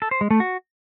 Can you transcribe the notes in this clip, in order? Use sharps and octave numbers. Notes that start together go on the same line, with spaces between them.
A4
C5
G#3
A3
F#4